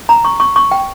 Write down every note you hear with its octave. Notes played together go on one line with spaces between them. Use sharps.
A#5
C#6
C#6
C#6
G5